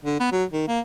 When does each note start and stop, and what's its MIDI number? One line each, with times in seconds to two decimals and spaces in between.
0.05 0.17 50
0.20 0.28 59
0.32 0.44 54
0.52 0.66 51
0.68 0.80 58